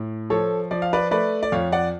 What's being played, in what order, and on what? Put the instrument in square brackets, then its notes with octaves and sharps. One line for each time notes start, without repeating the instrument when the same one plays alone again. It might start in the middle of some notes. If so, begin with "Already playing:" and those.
Already playing: [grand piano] A2
F3 A4 C#5
F3 D5
F5
B4 D5
A3 B4 D5
D5
F2 C#5 F5
D5 F#5